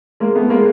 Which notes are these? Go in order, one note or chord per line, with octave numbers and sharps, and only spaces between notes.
G#3 A#3
A3 B3
G#3 A#3